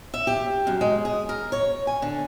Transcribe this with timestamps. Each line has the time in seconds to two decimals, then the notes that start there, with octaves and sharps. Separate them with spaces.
0.14 E5
0.27 G4
0.67 F#2
0.81 G#3
1.05 G#4
1.29 A#4
1.52 C#5
1.87 G#5
2.02 D3